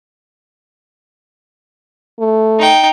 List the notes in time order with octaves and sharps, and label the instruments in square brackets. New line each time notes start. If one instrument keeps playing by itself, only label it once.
[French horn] A3
[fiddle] D#4 G5